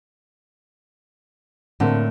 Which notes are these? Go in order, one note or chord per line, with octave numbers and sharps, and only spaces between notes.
A2 D3 A#3 C4